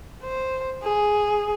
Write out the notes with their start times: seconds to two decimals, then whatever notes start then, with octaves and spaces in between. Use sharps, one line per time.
0.24 C5
0.83 G#4